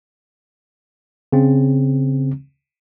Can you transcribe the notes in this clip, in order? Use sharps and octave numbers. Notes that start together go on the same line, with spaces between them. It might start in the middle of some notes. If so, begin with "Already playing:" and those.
C#3 C4